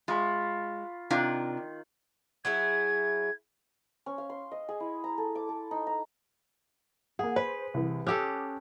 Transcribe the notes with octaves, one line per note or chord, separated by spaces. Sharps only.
G#3 F4 B5 C#6
C3 D#3 D4 F4
F#3 E4 G#4 G#6
C#4
F5
C6
D#5
G#4
E4
A#5
A4
D6
A4
D#4
A#5
A#3 G#4 F#5
B4 C5
C2 E3
C#4 G4 A4 D6 D#6 F#6